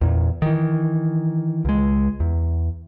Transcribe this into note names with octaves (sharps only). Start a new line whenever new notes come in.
E2 A#2
D#3 E3
C#2 G#3
E2